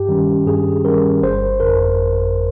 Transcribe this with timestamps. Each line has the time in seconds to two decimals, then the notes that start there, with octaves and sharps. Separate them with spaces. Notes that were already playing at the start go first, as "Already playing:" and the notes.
Already playing: G2 G4
0.09 D#3 G3 C#4
0.47 G2 G#4
0.85 D#3 G3 C#4 A#4
1.22 G1 C5
1.60 F2 C#3 A#4
1.98 G1